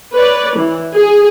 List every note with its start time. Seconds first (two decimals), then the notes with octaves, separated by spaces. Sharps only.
0.13 B4 C#5 D5
0.58 E3
0.95 G#4